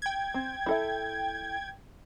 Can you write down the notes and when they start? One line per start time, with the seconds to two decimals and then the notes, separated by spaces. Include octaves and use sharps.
0.02 G5 G#6
0.34 C4
0.66 E4 A4 E5